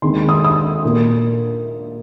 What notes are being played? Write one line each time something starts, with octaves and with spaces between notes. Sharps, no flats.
D#2 D#3 G#3 C4 C6
D#6
D#6
A#2 A#3